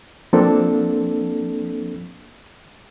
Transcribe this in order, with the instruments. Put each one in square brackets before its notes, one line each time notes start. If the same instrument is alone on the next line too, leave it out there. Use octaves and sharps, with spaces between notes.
[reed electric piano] F3 A#3 C4 D4 A4